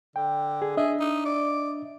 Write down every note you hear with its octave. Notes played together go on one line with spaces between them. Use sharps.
D3 G5
G#4
D4 G#4 D#5 E5
D#4
D5